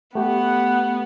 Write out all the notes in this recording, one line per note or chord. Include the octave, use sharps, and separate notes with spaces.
A3 B3 G4 F#5